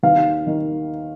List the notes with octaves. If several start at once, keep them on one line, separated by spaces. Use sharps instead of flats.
D#2 F5
D#3